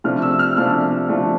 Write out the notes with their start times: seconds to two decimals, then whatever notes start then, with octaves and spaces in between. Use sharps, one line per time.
0.04 C3 F3 A3 D4 F6
0.22 E6
0.39 F6
0.57 C3 F3 A3 D4 F6
1.09 C3 F3 A3 D4